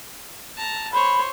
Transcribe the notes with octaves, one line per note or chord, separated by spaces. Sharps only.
A5 A#5
C5 C#5 B5